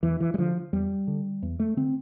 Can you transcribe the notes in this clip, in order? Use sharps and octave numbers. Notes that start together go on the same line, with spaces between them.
E2 E3
E3
G3
D3 F3
E2 G3
D3
E2
A3
D3 C4